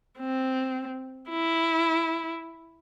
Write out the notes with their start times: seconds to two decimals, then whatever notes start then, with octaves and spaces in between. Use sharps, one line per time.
0.19 C4
1.30 E4